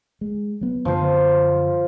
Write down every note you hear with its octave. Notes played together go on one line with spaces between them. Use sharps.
G#3
F#3 B3
F#2 D3 F3 B3 C5